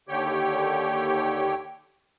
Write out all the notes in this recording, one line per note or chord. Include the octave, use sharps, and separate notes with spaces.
D#2 D3 G4 C#5 G5